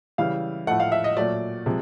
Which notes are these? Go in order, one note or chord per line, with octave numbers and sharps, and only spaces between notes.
C#3 E3 G3 F5
A2 F3 A3 F#5
F5
E5
D#5
A#2 F#3 A3 D5
C3 F3 G#3